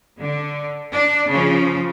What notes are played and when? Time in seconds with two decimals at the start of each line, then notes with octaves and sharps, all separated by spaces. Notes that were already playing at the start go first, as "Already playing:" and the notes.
0.20 D3
0.94 D4
1.29 C#3 F3